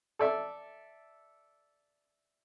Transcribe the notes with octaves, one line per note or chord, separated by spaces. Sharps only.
A4 D5 E5